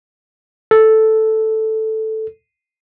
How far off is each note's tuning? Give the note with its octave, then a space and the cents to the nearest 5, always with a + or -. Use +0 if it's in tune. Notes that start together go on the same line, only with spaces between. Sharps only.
A4 +0